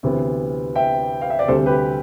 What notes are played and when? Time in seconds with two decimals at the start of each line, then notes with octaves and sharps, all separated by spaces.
0.03 D2 C3 E3 B3
0.76 E5 G5
1.21 F5
1.30 E5
1.39 D5
1.48 D2 C3 G3 C4 A4 C5
1.66 G4 B4